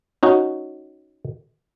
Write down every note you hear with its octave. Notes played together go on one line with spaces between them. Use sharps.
C#4 D#4 F#4